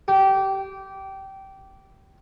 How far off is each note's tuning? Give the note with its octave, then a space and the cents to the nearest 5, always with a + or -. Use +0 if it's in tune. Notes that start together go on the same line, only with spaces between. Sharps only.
G4 -20